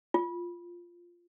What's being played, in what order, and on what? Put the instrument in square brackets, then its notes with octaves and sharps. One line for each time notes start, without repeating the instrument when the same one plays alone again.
[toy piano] F4